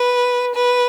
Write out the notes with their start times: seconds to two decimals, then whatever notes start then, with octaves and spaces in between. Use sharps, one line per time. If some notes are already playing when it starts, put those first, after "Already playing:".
Already playing: B4
0.55 B4